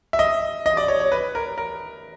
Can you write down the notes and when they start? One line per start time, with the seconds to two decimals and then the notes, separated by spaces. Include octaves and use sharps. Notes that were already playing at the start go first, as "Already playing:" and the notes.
0.13 E5
0.19 D#5
0.66 D#5
0.77 D5
0.88 C#5
1.00 C#5
1.12 B4
1.35 A#4
1.58 A#4